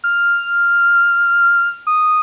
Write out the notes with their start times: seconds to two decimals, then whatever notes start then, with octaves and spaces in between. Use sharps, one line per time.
0.04 F6
1.87 D#6